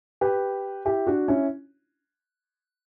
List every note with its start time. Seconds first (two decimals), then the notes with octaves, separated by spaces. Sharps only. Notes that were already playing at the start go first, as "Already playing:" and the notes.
0.21 G4 B4
0.85 E4 G4
1.07 D4 F#4
1.28 C#4 E4